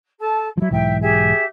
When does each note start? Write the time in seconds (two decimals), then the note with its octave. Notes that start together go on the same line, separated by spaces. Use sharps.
0.18 A4 A5
0.57 F3 F#3 E4
0.71 B1 G#2 E3 E5 G5
1.00 G4 G#4 E5